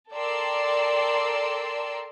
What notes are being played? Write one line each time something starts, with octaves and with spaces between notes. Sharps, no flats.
A4 A#4 D5 G5 C6 E6